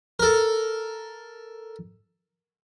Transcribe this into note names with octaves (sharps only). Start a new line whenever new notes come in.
A4 A#4